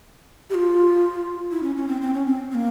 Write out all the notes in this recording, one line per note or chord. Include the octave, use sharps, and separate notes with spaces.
G4
F4
E4
C#4
C#4
C4
C4
C#4
C4
C4
A#3